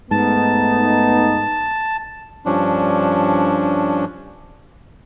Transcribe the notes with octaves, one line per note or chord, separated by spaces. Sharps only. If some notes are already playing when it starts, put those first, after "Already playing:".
G#2 A3 B3 D#4 A5
G2 F3 C#4 D4